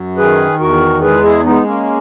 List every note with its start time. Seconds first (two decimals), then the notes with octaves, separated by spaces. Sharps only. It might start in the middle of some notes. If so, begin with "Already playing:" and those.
Already playing: F#2
0.17 D#3 G#4 B4
0.60 E2 F#4 A#4
1.01 G#3 G#4 B4
1.23 E4 G#4
1.43 G#3 B3 D#4
1.64 A#3 C#4